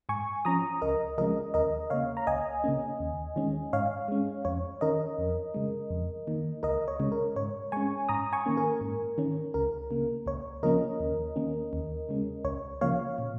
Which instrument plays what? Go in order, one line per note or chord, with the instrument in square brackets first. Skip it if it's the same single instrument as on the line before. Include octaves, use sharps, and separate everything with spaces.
[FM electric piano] G#2 G#5 C#6
F3 C#4 A#5 D#6
C#2 A#4 D#5
C#3 F3 G#3 C#4 A#4 D#5
D#2 A#4 D#5
C#3 A#3 C#5 F5
A#5
C#2 D#5 G#5
C#3 A#3 C#4
D#2
D#3 G#3 C#4
G#2 C#5 F5
G#3 C#4
F2 C#5
D#3 C#4 A#4 D#5
F2
C#3 G#3
F2
D#3 A#3
C#2 A#4 D#5
C#5
C#3 G#3
A#4
G#2 C#5
G#3 C#4 G#5 C#6
G#2 A#5 D#6
G#5 C#6
D#3 A#3 C#4
A#4
G#2
D#3 C#4
C#2 A#4
C#3 A#3
C#2 C#5
C#3 F3 A#3 C#4 A#4 D#5
D#2
D#3 A#3 C#4
D#2
C#3 G#3 C#4
C#2 C#5
C#3 F3 A#3 C#5 F5
A#2